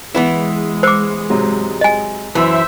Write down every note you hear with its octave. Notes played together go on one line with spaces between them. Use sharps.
E3 G#3 B3 E4
C5 D6 E6 C7 C#7
G#2 C3 F#3
D#5 G#5
F#2 E3 C5 E5